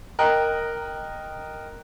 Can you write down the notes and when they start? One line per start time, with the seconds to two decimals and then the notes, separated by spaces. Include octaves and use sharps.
0.19 A#4 D#5 G5 A#5 F#6